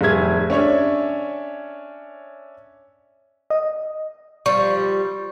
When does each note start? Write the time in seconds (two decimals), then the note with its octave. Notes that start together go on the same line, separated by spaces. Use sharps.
0.01 F1 G3 G#4 E5 G#6
0.50 C#4 D4 C#5 E5
3.50 D#5
4.46 F3 G3 C#6